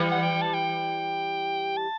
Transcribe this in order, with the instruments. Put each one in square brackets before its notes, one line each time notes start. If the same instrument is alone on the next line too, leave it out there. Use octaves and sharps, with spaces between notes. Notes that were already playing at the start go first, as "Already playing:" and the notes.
Already playing: [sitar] E3 G3
[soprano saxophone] F#5
G5
A5
G5
A5